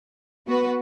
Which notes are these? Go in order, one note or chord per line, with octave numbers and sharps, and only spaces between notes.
B3 F#4 B4